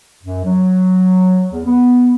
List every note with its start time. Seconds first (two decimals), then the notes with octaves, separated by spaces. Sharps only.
0.23 F#2
0.45 F#3
1.52 E2
1.65 B3